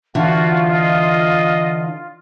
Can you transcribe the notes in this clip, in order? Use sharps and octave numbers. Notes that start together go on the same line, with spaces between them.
D3 E3 F4 F#4
D#5